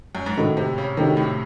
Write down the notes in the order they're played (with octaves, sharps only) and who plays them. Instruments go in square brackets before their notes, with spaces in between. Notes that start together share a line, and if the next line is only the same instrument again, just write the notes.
[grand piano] F#2
G#2
[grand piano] A2 [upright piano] D#3 A3 D#4 F#4
[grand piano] C3
C#3
[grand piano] C3 [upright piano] D#3 A3 D#4 F#4
[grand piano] A2